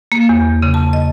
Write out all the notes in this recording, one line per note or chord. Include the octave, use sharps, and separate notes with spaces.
A#3
E2
C#3
A5
D#5